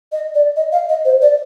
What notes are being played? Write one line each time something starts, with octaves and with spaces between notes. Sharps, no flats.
D#5
D5
D#5
F5
D#5
C5
D5